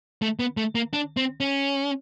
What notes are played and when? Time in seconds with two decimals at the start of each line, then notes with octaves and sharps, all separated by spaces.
0.22 A3
0.39 B3
0.57 A3
0.75 A#3
0.93 D4
1.17 C4
1.41 C#4